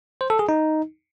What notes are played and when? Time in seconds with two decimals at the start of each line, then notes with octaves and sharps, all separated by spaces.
0.21 C5
0.30 A4
0.39 G#4
0.49 D#4